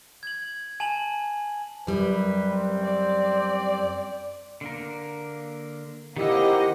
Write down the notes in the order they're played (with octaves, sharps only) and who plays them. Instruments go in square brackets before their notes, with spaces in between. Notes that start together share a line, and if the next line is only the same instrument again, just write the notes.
[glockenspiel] G#6 F#7
G#5 A5 F7 F#7
[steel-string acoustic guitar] F#2 G3 [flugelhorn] B4
[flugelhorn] C4
[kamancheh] D5
[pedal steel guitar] D3 A#3 A#4
[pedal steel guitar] D#3 E6 [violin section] A#3 C4 D#5 [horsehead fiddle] E4 F#5 [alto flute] G4